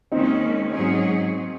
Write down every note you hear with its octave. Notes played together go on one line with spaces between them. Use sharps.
D#2 D#3 G#3 C4 C#4 D#4
G#2 F#3 C4 C#4 D#4 G#4